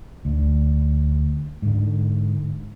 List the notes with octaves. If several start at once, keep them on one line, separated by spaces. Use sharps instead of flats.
D2
G#2 D3